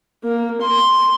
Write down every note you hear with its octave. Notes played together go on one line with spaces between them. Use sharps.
A#3
C6